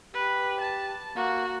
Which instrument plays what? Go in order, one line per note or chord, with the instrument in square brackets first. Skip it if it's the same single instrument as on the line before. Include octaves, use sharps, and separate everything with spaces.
[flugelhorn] G4 [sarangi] B4
[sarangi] A5
[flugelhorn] A#3 [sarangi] F#4